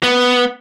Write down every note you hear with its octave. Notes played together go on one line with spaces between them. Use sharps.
B3